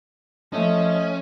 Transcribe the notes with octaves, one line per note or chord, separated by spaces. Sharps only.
F3 A3 C#4 D#5